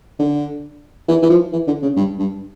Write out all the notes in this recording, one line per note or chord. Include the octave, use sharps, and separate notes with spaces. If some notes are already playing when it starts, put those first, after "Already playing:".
D3
E3
E3
F3
E3
D3
C#3
G2
G2